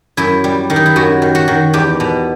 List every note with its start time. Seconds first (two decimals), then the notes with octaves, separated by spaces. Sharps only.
0.17 F#2 E4
0.44 G3
0.70 D#3
0.76 D#4
0.86 E4
0.96 F#2 F#4
1.22 D#3
1.35 F#4
1.48 D#3
1.73 E2 G4
2.00 B2